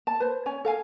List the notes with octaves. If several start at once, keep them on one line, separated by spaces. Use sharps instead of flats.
A5
B4 C5
C#4 C#5 G#5
A4 F5 G#5